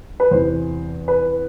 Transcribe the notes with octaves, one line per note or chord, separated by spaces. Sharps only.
B4
E2 C3 E3 C5
B4